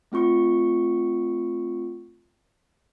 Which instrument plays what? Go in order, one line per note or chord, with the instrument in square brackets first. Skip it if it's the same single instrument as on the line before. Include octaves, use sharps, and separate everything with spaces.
[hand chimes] A3 C4 F4 C#6 C#7